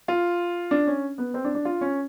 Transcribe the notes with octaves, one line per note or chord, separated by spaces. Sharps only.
F4
D4
C#4
B3
C4
D4
D4
F4
C#4